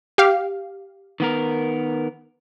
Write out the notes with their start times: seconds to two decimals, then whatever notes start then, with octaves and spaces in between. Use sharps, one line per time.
0.18 G4 F5
1.20 D#3 B3 A#4